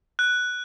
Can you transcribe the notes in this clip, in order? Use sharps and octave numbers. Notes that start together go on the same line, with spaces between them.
F#6